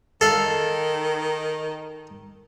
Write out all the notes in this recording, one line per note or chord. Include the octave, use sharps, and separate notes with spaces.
D#3 A4 F5